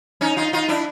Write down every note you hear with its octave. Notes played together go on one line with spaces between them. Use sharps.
C#4 D#4
D#4 F4
D#4 F4
D4 E4